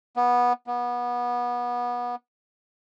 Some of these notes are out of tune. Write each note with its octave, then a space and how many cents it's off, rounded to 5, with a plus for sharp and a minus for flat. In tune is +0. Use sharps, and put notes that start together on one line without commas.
B3 -15
B3 -25